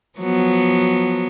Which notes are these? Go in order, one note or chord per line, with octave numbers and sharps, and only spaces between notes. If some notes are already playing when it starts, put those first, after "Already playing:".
F3 F#3 B3